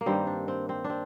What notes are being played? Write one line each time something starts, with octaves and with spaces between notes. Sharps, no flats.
A#3
G2 D#3 G3 C4
D4
C4
C4
D4
C4